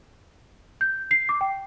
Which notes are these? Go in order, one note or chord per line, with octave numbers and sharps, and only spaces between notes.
G6
C7
D6
G5